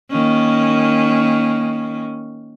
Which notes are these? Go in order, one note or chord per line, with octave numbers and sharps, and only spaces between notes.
D#3 A#3 C#4